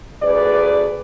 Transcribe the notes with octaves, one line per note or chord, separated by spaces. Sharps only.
D2 G#4 B4 D5